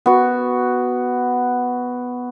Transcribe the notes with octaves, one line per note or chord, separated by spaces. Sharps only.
B3 F#4